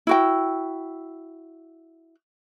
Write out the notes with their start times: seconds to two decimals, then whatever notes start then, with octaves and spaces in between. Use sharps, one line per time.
0.07 E4 F#4 G5